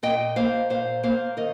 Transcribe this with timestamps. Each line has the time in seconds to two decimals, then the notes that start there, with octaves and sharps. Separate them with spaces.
0.03 A#2 D#5 G5
0.36 A#3 C5 F5
0.70 A#2 C5 F5
1.03 A#3 C5 F5
1.37 D#3 A#4 D#5